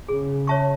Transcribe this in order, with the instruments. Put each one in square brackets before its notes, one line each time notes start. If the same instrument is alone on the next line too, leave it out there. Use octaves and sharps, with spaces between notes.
[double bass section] C#3 [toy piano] G#4
[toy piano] C#5 E5 A5 C#6